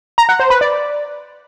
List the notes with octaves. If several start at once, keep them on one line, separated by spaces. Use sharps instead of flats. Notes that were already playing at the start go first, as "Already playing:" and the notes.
A#5
F#5
C5
B4
D5